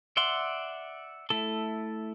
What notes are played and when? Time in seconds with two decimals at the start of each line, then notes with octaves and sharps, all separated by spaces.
0.17 D5 E5 F#5 C6
1.30 A3 E4 A4